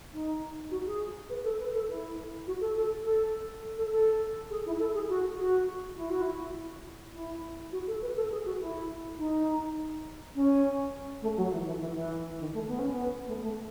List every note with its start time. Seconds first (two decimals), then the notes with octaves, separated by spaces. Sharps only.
0.13 D#4
0.71 F#4
0.86 G#4
1.30 B4
1.44 A4
1.59 B4
1.74 A4
1.89 E4
2.47 F#4
2.61 A4
2.76 A4
3.05 A4
3.78 A4
3.92 A4
4.50 G#4
4.66 E4
4.80 A4
4.94 G#4
5.09 F#4
5.39 F#4
5.97 E4
6.10 F#4
6.22 E4
7.14 E4
7.72 F#4
7.87 A4
8.02 B4
8.17 A4
8.31 G#4
8.45 F#4
8.60 E4
9.18 D#4
10.35 C#4
11.22 A3
11.37 F#3
11.52 E3
11.66 E3
11.80 E3
11.95 E3
12.40 D#3
12.54 A3
12.68 B3
12.79 C#4
12.91 B3
13.27 A3
13.42 A3